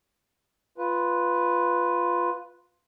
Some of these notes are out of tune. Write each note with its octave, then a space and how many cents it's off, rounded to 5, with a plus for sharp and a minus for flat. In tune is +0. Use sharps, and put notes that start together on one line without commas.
F4 +0 B4 +0